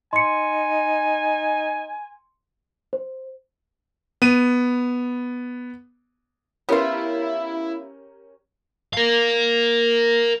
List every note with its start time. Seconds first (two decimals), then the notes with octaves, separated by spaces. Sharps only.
0.13 D#4 G#5 C6 C#7
2.93 C5
4.22 B3 D#7
6.69 B3 C#4 E4 F4 G4 A#4
8.93 A#4 F5